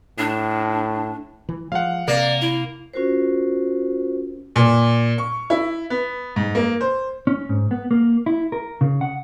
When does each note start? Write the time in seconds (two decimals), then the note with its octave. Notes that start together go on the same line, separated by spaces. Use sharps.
0.18 A2 D4
1.49 E3
1.72 F3 G#3 F5 F#5
2.08 C3 A#3 D5
2.41 E4
2.93 C#4 F4 F#4 A#4 C5
4.56 A#2
5.18 C#6
5.50 E4
5.90 B3
6.36 G#2
6.55 A#3
6.81 C5
7.27 C#4
7.49 G#2
7.71 B3
7.91 A#3
8.26 E4
8.52 A#4
8.81 C#3
9.01 F#5